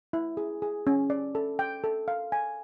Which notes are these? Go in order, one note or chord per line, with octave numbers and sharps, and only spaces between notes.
E4
G#4
G#4
C#4
D5
A4
G5
A4
F5
G#5